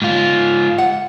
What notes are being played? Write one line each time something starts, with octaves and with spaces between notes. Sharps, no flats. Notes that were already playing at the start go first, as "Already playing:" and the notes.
G#2 F4
F#5